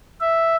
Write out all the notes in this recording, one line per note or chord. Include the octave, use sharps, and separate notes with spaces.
E5